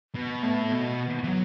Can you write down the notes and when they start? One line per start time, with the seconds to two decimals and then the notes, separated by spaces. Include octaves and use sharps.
0.15 B2
0.43 A2 B3
0.72 B2 B3
1.24 E3
1.27 F#3